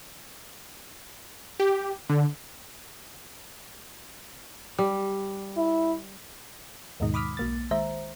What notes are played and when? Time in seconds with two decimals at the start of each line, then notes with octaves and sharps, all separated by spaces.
1.60 G4
2.09 D3
4.79 G3
5.57 E4
7.00 D#2 G#2 B2 D#3 G#3 D#4
7.14 B5 D6 D#6 F6 B6
7.37 B1 A#3 A6
7.71 D#3 G#3 C5 E5 A#5